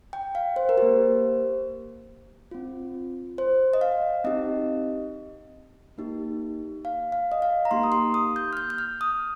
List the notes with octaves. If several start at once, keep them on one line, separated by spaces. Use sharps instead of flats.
G5
F5
C5
A#4
A#3 G4 C5
C4 F4
C5
D#5
F5
C4 D#4 G4 D#5
A#3 D#4 G4
F5
F5
D#5
F5
A#5
A#3 D#4 G4 C6
D#6
C6
D#6
G6
F6
G6
G6
F6
D#6